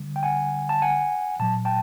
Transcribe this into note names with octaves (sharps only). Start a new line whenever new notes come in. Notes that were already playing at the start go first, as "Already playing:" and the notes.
Already playing: D3 G3
G5
F#5 G#5
A5
F#5 G#5
A#2 F#3 A5
G5 A5